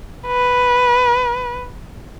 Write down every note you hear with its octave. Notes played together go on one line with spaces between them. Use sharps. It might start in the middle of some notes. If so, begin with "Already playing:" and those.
B4